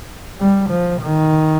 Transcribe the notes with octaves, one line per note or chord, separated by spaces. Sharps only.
G3
F3
D#3